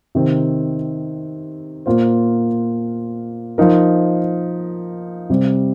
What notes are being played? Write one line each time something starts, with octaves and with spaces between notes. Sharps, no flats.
C3 D#3 C4
A#2 A#3 F4 C5
F3 D#4 A#4
C3 G3 C4